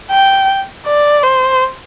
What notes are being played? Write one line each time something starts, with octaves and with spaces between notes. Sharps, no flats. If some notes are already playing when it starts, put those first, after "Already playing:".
G5
D5
C5